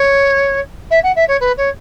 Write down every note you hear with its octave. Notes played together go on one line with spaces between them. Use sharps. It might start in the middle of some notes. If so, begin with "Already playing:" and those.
Already playing: C#5
E5
F#5
E5
C#5
B4
C#5